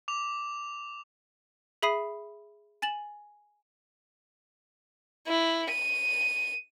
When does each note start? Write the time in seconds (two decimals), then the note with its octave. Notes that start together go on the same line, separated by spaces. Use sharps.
0.08 D6 F7
1.83 G#4 E5 B5 D#6 C7 D#7
2.82 G#5 A6 E7 F#7
5.28 E4
5.72 D#7